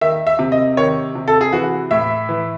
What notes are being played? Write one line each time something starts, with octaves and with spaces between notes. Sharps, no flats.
D#3 E5
E5
C3
D#5
D#3 C#5
C3
A4
G#4
E3 F#4
A2 E5
E3